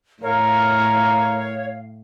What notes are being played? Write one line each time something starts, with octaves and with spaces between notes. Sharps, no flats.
A2 A#4 C#5 F5